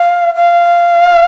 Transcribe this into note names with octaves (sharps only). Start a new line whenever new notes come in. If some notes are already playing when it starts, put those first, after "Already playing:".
Already playing: F5
F5